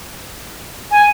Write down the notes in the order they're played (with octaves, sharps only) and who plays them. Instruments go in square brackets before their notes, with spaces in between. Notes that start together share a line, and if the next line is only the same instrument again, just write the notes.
[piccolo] G#5